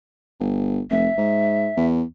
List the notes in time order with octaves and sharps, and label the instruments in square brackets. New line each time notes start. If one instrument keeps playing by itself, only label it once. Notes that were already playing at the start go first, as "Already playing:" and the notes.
[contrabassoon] G1
[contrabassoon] F1 [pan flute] E5
[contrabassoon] G#2
E2